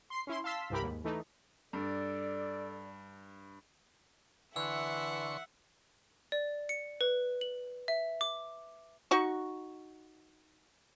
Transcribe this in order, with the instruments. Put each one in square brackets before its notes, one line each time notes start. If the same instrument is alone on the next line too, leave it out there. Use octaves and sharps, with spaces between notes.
[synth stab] C6 C7
C#4 E4 C6
F5 A5 C6 E6 B6
C2 G2 E3 G4 A#4 B5
D#2 G#2
E3 A3 D#4
[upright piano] G2 [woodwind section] A4 D5
[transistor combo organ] D3 C6 C#6 [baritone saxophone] E3 [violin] E5 F#5 [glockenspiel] E6 F#6
[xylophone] D5
C#7
B4
F#7
E5
D6
[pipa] D#4 F#4 C#6